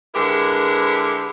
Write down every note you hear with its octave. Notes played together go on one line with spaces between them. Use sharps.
D3 G#3 E4 G4 A#4 B4